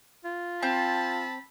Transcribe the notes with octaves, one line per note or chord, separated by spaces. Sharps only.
F4
C4 A5 B5